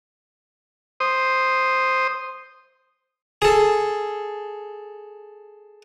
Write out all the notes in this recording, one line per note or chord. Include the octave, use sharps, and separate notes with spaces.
C5 D#6
G#4 A4